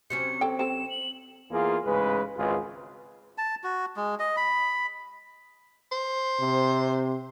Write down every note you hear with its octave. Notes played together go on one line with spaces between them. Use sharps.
C3 F#3 C#4 C#7
A4 G5
C4 A4 E7
F#7
E2 A#3 F4 G#4
A1 G#2 C#3 G#3 B4
G#1 C#2 G#2 F4 G#4 B4
A5
F#4
G#3
D#5
B5
C5
C3